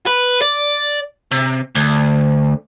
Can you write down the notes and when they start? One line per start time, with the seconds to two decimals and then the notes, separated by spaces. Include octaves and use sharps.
0.06 B4
0.41 D5
1.32 C3
1.75 D2